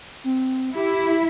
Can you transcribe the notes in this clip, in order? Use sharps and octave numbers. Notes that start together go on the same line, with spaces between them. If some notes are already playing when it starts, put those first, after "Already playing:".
C4
E4 G4